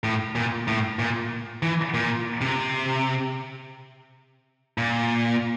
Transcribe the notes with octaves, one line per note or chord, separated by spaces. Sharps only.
A2
A#2
A2
A#2
E3
A#2
C3
A#2